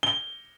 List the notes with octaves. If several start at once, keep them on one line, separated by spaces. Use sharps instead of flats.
G7